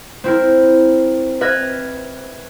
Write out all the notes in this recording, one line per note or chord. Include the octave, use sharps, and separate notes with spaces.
C4 E4 A#4
B4 E5 F6 G#6 A#6